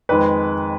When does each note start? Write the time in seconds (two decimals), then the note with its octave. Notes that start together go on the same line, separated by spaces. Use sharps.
0.09 F2 D#3 G#3 B4